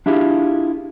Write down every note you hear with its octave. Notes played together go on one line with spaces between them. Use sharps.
D4 E4 F4 G4 G#4